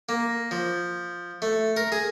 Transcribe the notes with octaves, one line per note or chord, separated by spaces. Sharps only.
A#3
F3
A3
A#4
G#4